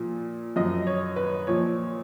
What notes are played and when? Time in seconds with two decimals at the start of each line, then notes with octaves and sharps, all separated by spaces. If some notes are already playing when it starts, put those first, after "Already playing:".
Already playing: A#2 F3
0.56 F#2 F3 D#5
0.87 C#5
1.16 B4
1.47 A#2 F3 C#5